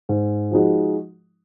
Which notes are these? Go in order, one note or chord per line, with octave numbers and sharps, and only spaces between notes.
G#2
F3 G#3 D#4 F#4